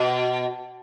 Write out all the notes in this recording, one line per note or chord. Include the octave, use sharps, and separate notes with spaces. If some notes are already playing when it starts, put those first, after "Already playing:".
Already playing: B2